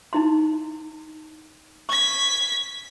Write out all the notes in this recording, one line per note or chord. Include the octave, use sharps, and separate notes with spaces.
D#4 E4 C6
C#6 G#6 B6